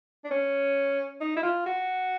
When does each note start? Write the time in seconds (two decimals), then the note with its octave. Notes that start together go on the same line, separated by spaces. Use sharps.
0.24 D4
0.31 C#4
1.21 D#4
1.36 E4
1.43 F4
1.66 F#4